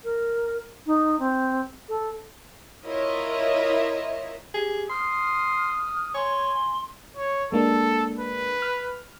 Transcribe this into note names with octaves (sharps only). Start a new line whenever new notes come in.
A#4
D#4
C4
A4
E4 F4 A#4 C#5 D#5 E5
G4 G#4
C6 D#6 F6
C#5 G#5 C6
C#5
G#3 A#3 D4 A4
B4
F6